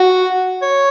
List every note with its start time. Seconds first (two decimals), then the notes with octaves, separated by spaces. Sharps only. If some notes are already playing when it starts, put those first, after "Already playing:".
Already playing: F#4
0.62 C#5